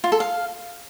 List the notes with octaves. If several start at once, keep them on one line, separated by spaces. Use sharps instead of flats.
F4
A4
F5